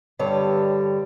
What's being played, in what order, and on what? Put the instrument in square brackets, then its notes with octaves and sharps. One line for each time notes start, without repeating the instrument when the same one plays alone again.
[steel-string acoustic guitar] G2 D3 G3 C#5